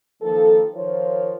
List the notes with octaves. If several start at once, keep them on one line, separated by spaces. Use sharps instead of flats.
D#3 F3 A#3 A4
D#3 F3 F4 A#4 C5 C#5